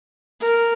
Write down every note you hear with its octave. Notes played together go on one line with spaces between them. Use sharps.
A#4